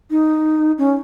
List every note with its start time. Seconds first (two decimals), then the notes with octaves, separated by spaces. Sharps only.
0.11 D#4
0.78 C#4